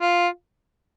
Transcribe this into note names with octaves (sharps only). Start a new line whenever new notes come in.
F4